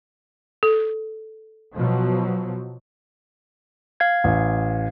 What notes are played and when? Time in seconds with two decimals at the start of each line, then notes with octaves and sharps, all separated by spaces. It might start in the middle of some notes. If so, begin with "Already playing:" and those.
0.63 A4
1.77 B2 F3 F#3
4.00 F5 G#6
4.24 A1